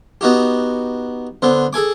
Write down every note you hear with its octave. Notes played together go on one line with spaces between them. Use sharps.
B3 D#4 F#4 G4
D3 B3 C5
G#4 A4 G#5 D6